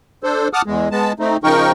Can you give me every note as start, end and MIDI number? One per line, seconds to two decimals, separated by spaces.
0.24 0.48 62
0.24 0.48 69
0.24 0.48 72
0.53 0.62 78
0.53 0.62 81
0.53 0.62 86
0.53 0.62 87
0.53 0.62 89
0.66 0.89 40
0.66 0.89 56
0.91 1.13 56
0.91 1.13 59
0.91 1.13 81
1.20 1.37 57
1.20 1.37 60
1.20 1.37 63
1.44 1.72 49
1.44 1.72 53
1.44 1.72 63
1.44 1.72 70
1.44 1.72 79
1.44 1.72 85